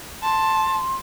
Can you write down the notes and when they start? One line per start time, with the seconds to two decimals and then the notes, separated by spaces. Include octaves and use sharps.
0.23 A5 C6